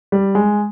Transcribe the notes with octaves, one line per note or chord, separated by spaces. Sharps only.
G3
G#3